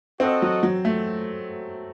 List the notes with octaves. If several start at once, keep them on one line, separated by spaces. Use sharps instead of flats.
C4 F#4 A4 D#5 F#5
F#3
F#3
A3